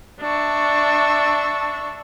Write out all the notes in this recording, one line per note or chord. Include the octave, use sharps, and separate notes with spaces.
D4 E5 C#6